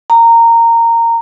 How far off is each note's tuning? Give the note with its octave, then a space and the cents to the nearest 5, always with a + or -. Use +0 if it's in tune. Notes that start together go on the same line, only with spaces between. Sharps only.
A#5 -15